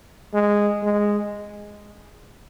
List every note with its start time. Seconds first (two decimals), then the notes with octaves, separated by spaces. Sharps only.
0.34 G#3
0.83 G#3